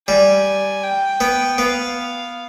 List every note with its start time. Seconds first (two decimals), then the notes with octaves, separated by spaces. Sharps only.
0.08 G3 G#5
0.83 G5
1.20 B3
1.58 B3 F5